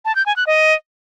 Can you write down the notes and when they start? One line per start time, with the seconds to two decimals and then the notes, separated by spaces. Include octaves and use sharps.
0.05 A5
0.16 G6
0.26 G#5
0.36 F#6
0.47 D#5